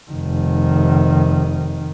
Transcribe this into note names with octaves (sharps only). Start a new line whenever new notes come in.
F1 D#3